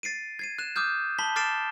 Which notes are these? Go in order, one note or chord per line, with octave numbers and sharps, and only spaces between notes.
A6 C7 D7 D#7
G#6 C7 D#7
F#6 E7
D6 D#6 F6 G6
A5 B5 B6 G7
D6 F6 A6 C7 D7 E7